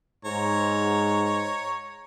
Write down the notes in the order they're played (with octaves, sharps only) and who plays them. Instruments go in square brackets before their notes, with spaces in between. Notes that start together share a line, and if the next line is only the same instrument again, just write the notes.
[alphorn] G#2 [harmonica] C#5 A#5